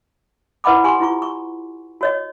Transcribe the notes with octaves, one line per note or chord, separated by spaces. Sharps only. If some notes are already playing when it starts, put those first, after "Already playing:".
E4 B4 D#5 F#5 B5 D6
G4 G#5 C6 C#6
E4 F4 C#6
C#6
F#4 C#5 D#5